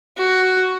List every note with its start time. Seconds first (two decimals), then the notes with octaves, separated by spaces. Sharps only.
0.17 F#4